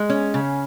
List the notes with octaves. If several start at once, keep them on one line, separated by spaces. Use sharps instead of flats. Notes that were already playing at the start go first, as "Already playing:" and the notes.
Already playing: G#3
C#4
C#3